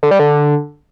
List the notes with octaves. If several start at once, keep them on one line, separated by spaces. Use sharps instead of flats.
D3
G3
D3